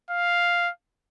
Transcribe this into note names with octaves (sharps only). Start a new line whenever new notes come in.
F5